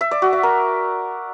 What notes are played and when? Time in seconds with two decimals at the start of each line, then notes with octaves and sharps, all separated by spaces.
0.01 E5
0.11 D5
0.22 F#4
0.33 E5
0.43 A#4